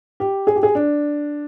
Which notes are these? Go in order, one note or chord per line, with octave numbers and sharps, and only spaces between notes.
G4
G#4
G4
G#4
D4